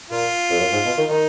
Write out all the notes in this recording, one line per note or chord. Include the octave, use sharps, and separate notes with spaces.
A#2 F4
F2
F#2
G#2
B2
D#3
D#3 D#4